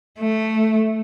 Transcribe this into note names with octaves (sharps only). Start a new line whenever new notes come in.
A3